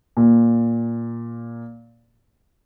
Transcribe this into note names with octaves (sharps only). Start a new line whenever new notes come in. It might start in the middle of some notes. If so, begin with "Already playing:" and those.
A#2